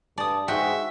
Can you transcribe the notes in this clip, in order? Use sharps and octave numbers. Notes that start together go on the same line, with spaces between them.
G2 D5 A5 D#6
G#2 F#4 E5 G5 C6